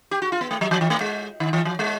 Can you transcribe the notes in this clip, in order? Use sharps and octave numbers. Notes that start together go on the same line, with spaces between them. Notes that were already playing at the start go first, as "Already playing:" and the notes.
G4
F#4
F4
B3
A3
F#3
F3
E3
A3
G#3
D#3
E3
F3
G#3